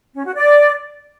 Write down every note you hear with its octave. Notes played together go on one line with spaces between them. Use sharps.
C#4
F#4
D5